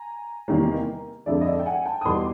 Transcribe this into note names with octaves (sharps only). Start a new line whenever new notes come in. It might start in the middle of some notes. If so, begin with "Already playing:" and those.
Already playing: G#5 A#5
E2 C3 D#3 G3 A#3
F2 D3 F3 G#3 D5 E5
D#5
D5 E5
G5
F#5 G#5
G5 A5
D#6
E2 B2 G3 B3 D#4 C6 D6